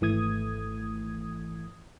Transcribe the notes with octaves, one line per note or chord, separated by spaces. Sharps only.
G#1 E3 A3 D#6 G#6